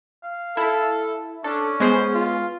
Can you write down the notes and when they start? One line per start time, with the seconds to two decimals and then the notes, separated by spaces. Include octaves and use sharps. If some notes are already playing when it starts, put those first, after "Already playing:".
0.24 F5
0.57 E4 A4
1.44 C#4 D4 A4
1.80 G#3 B3 G#4 C5
2.14 F4